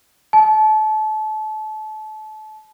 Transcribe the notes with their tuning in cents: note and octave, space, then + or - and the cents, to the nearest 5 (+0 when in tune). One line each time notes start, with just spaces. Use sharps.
A5 -30